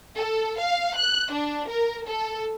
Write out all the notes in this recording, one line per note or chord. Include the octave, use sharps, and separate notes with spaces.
A4
F5
F#6
D4
A#4
A4